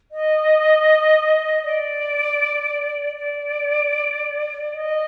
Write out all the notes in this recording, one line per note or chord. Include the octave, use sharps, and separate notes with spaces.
D#5
D5
D5
D#5